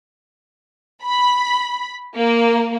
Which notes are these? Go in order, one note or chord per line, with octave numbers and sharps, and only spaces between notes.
B5
A#3